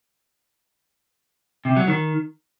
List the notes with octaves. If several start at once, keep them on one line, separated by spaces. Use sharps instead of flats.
C3
F#3
D#3